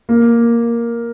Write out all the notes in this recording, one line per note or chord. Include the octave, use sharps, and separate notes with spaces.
A#3